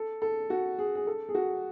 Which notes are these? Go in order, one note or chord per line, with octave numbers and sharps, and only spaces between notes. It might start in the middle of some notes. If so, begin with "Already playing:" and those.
Already playing: A4
A4
F#4
G#4
G#4
A4
G#4
F#4